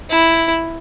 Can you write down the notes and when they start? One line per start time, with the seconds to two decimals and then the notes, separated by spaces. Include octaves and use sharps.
0.10 E4